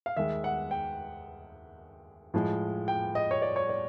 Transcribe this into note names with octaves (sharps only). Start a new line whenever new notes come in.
F5
D#2 D#3 G#3 E5
F#5
G5
A2 F3 G#3
G5
D#5
C#5
D5
C#5
D5